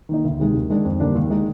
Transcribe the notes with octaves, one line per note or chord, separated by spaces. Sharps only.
D#3 A#3 D#4
D2
C3 D#3 G#3
D#2
D#3 G#3 D4
F2
D3 G3 A#3 D4
D#2
D#3 G#3 D#4